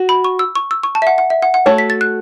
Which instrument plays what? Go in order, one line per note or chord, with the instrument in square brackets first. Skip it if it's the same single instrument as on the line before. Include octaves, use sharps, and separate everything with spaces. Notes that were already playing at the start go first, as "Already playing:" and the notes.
Already playing: [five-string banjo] F#4
[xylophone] B5
C#6
E6
C#6
E6
C#6
A5
E5
F#5
F#5
E5
F#5
F#5
[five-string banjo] A3 F#4 A4 C#5 [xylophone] A5
[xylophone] B6
A6
F#6